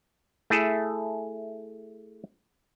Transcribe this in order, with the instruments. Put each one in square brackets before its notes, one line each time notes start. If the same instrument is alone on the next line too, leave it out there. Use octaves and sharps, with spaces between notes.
[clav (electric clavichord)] A3 E4 G#4 A4